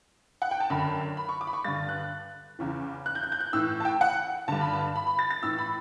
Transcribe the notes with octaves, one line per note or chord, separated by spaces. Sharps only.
F#5
G5
A5
F#2 D3 B5
B5
C#6
D6
B5
C#6
G2 D3 A6
F#6
E2 C#3 E3
F#6
G6
F#6
G6
F#6
A2 E3 E6
A5
G5
F#5
G2 D3 A5
B5
A5
B5
B5
A6
A6
A2 E3 E6
B5